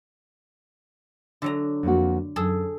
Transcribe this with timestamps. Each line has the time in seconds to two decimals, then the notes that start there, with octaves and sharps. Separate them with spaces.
1.42 D3 F#3 A#5
1.83 F2 A#3 F#4
2.36 F#2 G#4 A4